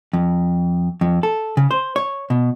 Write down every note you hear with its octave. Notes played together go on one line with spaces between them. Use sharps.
F2
F2
A4
C#3
C5
C#5
B2